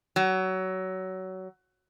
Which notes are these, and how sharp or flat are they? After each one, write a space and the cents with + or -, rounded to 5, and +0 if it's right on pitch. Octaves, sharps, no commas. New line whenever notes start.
F#3 +20